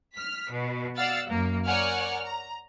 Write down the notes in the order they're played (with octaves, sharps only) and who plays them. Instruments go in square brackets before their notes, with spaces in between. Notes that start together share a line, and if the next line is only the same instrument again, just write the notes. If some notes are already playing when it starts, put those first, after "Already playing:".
[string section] F6 B6
B2
D5 F5 F#5 E6 A6
F#2 A#3
A#4 C#5 D5 F#5 G#5 F6
A#5